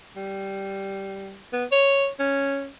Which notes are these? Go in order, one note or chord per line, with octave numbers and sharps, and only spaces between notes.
G3
B3
C#5
C#4